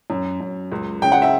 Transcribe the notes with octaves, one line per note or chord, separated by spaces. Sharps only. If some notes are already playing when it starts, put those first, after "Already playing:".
F#2
F#2
C#2
C#3 G5
F#5
E5